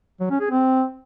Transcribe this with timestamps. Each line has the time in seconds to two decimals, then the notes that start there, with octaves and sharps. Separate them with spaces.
0.20 F#3
0.30 C#4
0.40 G#4
0.50 C4